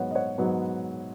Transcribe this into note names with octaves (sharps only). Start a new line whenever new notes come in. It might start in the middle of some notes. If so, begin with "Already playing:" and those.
Already playing: G#2 F#3 B3 C#5 F#5
D#5
C#5 F#5
G#2 F#3 B3